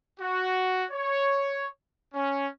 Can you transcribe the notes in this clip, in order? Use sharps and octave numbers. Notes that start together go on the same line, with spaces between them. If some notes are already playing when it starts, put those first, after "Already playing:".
F#4
C#5
C#4